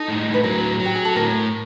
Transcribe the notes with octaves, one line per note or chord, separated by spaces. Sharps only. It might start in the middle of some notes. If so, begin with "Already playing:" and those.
Already playing: D#4 A4
A2
B4
F#3 A#4
F#3
G4
G#4
A4
A2 A#4